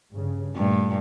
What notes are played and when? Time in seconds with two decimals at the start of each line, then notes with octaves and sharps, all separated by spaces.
0.13 G2 C#3
0.56 G2 A#2 A3